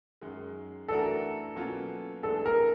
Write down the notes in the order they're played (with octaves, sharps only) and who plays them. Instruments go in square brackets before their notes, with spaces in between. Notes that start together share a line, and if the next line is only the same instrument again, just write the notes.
[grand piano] F#2 D#3 G#3
[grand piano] E3 A3 D4 F#4 A#4 [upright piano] A4
[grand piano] B2 F#3 A#3 C#4 F4
[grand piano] A2 E3 G#3 B3 D4 [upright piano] A4
[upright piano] A#4